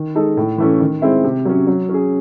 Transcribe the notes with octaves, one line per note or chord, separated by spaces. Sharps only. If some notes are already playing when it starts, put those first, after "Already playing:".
Already playing: D#3
G#3 D#4 A4
A2
E3 A3 C#4
D#3
G#3 C4 E4
C3
F#3 C#4
F#3
C#4 G#4